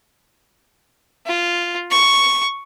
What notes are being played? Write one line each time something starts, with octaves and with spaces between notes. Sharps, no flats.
F4
C#6